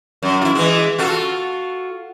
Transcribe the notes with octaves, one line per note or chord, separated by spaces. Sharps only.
F#2
E4 F4
E3 G#3
F4 F#4 A4